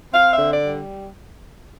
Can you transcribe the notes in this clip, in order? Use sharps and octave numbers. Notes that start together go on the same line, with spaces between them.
C4 F5
E5
D3
D5
G3